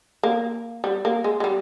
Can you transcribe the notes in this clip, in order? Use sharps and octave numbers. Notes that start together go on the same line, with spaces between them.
A#3
G3
A#3
G#3
G#3
G3